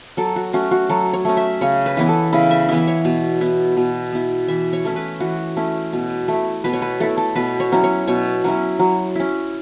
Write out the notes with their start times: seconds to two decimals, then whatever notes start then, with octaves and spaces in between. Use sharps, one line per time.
0.17 F#3 A4
0.36 F#4
0.53 A3 C#4 F#4
0.71 F#4
0.89 F#3 A4
1.13 C#5
1.25 A3 C#4
1.37 E5
1.61 C#3 C#5
1.86 B4
1.97 E3 B3 E4
2.09 A4
2.33 C#3 E4
2.51 E5
2.68 E3 B3 E4 E5
2.87 C#5
3.05 B2
3.41 B3 E4
3.77 B2
4.12 B3 E4
4.48 E3 E5
4.73 C#5
4.85 A3 C#4 E4
4.96 B4
5.20 E3 F#4
5.57 A3 C#4 E4
5.93 B2
6.28 A3 E4
6.64 B2 B4
6.73 C#5
6.82 B4
7.00 A3 E4 A4
7.18 A4
7.35 B2 B4
7.60 C#5
7.72 F#3 C#4 E4
7.83 C#5
8.08 B2 C#5
8.44 F#3 C#4 E4
8.79 F#3
9.15 C#4 E4